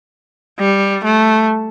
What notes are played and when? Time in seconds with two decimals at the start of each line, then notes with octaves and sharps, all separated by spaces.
0.59 G3
1.04 A3